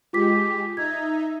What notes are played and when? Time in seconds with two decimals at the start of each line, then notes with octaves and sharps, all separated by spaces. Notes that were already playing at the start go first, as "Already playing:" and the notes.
0.13 G#3 F4 G4 D6 B6
0.77 D#4 E5 A#5 G#6